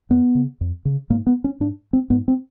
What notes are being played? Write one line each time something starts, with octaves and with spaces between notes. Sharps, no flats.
F2 B3
C#3
F2
C#3
G#2 A#3
B3
C#4
G#2 D4
C4
G#2 B3
C4